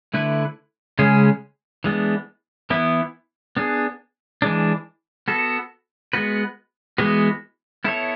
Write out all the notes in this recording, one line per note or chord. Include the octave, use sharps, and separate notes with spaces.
D3 A3 E4 B4
C#3 G#3 C#4 G#4
E3 G#3 B3 D4
E3 B3 E4
B3 D4 G#4
E3 G#3 D4
B3 F#4 A4
G#3 B3 F#4 B4
E3 G#3 B3 F#4 B4
B3 E4 A4 C#5